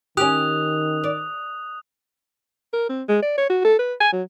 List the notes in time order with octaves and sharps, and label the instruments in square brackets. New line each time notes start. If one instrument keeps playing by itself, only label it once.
[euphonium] D#3 [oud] C#4 G4 [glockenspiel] D#6 F#6 F7
[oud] D5
[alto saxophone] A#4
C4
G#3
D5
C#5
F#4
A4
B4
G#5
F#3